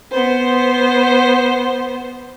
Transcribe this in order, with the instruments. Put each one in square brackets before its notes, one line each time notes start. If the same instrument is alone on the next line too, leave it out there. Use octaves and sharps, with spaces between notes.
[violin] B3 C5